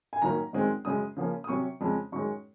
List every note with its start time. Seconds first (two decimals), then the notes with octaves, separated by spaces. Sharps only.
0.13 G#5
0.22 F#2 D#3 F#3 A#3 C#4 A#5
0.53 F#2 D#3 G#3 C4
0.85 F#2 C#3 G#3 C#4 D#6
1.16 C#3 F3 A#3 C#4
1.44 D#6
1.48 C3 F#3 C#4 C#6
1.80 F2 C#3 G#3 C#4
2.12 F#2 D#3 G#3 C#4 C#6